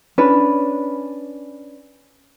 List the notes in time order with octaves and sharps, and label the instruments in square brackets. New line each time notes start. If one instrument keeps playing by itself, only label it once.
[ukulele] C#4 D4 B4